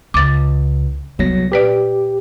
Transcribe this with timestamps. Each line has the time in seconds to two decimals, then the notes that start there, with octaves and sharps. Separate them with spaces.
0.14 C#2 D6 A6
1.19 C2 F#3 B3 A#6
1.52 A#2 G4 B4 D5